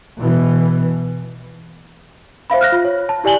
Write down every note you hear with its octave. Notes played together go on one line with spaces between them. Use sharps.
B2 E3
C5 E5 F5 B5
F6 F#6 A#6
F4
C#5
A5
E4 G4 D5 G#5 F#7 G7